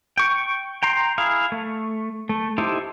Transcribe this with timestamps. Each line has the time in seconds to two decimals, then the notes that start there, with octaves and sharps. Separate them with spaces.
0.18 G5 C#6
0.83 G5 A#5 C6
1.18 E4 G#4 F5
1.52 A3
2.29 A3
2.58 D#4 E4 G4 A4 C5